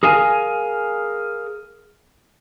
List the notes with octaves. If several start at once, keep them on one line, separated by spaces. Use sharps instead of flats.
G#4 A#4 F5 G#5